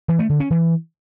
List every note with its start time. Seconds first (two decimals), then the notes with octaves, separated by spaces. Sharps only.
0.08 E3
0.19 A3
0.29 D3
0.40 C#4
0.50 E3